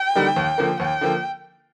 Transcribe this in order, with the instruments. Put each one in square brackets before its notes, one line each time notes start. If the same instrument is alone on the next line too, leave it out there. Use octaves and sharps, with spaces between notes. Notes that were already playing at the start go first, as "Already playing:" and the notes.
Already playing: [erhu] G5
[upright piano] D3 G3 A#3 D#4
D#2
D3 F3 A#3
[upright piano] D#2 [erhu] G5
[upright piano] D3 F3 A#3